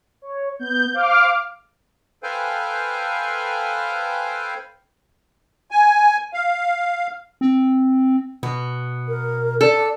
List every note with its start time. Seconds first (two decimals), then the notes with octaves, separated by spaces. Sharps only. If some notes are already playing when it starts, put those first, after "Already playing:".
0.22 C#5
0.59 B3 G6
0.94 C5 F5 D6 F6
2.23 A4 B4 C5 F5 G5 G#5
5.71 G#5
6.34 F5
7.41 C4
8.43 B2 B3
9.08 A#4
9.61 A4 D5